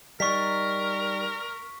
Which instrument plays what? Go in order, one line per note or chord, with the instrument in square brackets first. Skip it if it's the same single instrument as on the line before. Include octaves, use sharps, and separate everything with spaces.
[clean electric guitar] G3 D#4 [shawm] A#4 [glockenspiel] C#6 B6